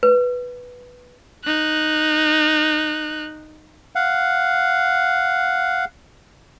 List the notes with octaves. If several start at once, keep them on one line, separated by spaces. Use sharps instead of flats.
B4
D#4 F#6
F5 F#5